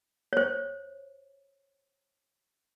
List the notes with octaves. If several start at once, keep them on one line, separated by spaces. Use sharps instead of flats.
C5 C#5